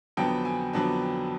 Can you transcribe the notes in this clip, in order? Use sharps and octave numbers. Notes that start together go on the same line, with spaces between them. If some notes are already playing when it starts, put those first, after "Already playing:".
F2 D3 F#3 B3 D4 G5
G#5
F2 D3 F#3 B3 D4